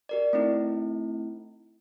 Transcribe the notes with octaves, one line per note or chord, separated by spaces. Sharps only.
G4 A#4 D5
A3 C4 D#4 E4